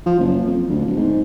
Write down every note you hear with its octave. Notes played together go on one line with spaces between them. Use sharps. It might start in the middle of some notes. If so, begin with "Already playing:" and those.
F3
F#1
F2
D2
D1
G#2